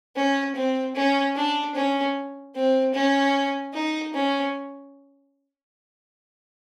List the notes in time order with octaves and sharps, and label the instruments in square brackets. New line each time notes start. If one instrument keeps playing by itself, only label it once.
[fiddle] C#4
C4
C#4
D4
C#4
C4
C#4
D#4
C#4